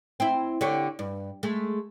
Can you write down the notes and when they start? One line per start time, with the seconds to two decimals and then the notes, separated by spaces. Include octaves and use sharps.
0.20 C4 E4
0.61 D3 G4 C#5
0.99 G2
1.43 G#3 A3